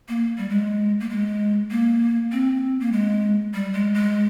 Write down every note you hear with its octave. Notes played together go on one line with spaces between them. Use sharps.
A#3
G3
G#3
A#3
G#3
A#3
C4
A#3
G#3
G3
G#3
G#3